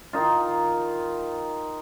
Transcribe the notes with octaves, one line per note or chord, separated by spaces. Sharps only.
D#3 D#4 F4